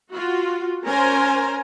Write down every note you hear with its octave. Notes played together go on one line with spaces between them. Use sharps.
F4 F#4
C#4 A#4 C5 G#5 A#5